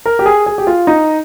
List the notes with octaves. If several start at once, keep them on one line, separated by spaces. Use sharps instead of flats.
A#4
G4
G#4
G#4
G4
F4
D#4